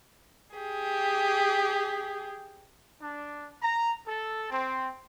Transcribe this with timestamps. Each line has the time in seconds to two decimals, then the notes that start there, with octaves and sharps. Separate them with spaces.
0.56 G4 G#4
3.00 D4
3.61 A#5
4.06 A4
4.51 C4